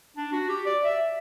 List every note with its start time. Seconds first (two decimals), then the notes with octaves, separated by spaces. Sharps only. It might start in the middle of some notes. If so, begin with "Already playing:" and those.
0.17 D4
0.33 F#4
0.49 G4
0.66 D5
0.84 E5